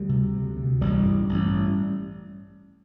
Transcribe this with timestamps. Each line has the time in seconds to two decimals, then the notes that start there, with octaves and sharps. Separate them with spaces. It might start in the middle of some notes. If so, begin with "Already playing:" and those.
Already playing: D2 G3
0.09 C3
0.34 D2
0.57 D2
0.81 A1 G3
1.05 G2
1.29 A1